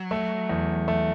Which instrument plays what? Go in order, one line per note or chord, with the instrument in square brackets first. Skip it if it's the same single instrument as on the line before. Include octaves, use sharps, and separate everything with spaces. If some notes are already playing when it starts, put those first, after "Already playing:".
Already playing: [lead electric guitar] F#3
[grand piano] A3
E2
A3